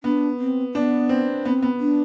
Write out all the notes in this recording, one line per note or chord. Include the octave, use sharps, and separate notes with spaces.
B3 D4
C4
B3 D4
C4
B3 C4
B3
D4